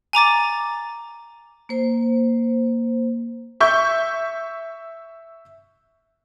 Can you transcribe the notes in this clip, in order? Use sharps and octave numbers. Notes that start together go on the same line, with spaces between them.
G#5 A#5 D6 A6
A#3 C5
E5 C#6 G6